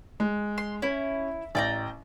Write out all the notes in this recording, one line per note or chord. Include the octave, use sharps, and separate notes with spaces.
G#3
C6
C#4 E4
A1 D5 G5 A#5